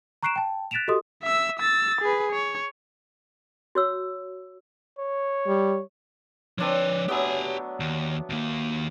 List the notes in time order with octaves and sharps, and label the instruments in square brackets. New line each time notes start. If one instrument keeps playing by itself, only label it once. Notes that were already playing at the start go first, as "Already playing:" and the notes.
[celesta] A#5 C#6 F#6 C7 D7 E7
G5 A5
F#6 A6 B6 D7 E7 F7
F#4 G4 A4 D#5 C6 D#6
[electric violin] E5 E6
E6 A6
G#4 B4
C#5
[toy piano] F#4 C#5 E6
[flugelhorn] C#5
[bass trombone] G3
[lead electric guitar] F3 B4 [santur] C4 D4 C#5
[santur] F#3 A3 B3 [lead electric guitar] G4 G#5
[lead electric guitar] D#2
D#2 A#3